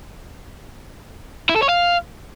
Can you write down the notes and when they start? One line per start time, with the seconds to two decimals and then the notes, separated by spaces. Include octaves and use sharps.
1.49 E4
1.56 A4
1.62 C#5
1.69 F5